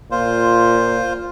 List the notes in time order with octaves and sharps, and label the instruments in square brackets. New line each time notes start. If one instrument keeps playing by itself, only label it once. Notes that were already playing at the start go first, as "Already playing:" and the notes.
[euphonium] A#2 [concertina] F4 C5